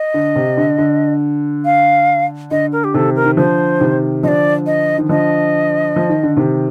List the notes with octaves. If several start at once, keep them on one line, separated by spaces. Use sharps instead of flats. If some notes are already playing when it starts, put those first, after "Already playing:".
Already playing: D#5
D3
C3
D3
D3
F5
D3 D#5
A#4
G4
C3 D#3 A4
A#4
D#3
D3 F3 C5
C3 D#3
D3 F3 D5 D#5
D#5
D#3
D3 F3 D#5
F3
D#3
D3
C3 D#3